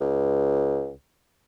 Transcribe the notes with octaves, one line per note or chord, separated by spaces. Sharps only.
C#2